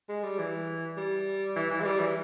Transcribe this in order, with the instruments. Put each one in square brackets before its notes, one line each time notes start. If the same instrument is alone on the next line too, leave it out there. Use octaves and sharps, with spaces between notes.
[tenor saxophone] G#3
G3
E3
G3
E3
E3
G#3
G3
E3